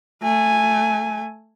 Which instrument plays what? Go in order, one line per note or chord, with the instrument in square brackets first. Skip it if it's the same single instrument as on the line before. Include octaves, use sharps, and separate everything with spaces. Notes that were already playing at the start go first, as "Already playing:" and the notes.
[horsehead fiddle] A3 G#5